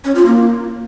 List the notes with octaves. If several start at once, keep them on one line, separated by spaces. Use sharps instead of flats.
C#4
F4
A#3